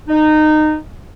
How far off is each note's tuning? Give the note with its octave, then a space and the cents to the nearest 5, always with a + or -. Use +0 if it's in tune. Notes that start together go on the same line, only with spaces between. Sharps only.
D#4 -20